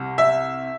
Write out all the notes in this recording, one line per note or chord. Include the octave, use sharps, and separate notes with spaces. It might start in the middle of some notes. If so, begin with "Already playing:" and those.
Already playing: C2 C3
E5